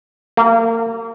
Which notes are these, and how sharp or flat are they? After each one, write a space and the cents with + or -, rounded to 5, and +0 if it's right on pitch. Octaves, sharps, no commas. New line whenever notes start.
A#3 -35